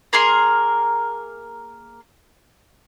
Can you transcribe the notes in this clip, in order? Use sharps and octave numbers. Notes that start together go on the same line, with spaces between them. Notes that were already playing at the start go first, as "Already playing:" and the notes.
A#3 G#4 A#4 C6